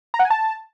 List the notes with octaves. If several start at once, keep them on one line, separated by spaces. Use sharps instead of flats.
A#5
F#5
G#5
A5